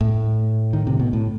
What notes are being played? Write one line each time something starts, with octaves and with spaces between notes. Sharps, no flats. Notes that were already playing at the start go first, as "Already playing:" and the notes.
A2
D#3
C3
B2
A2